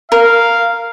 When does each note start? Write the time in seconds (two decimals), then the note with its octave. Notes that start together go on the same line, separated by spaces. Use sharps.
0.12 A#4 F5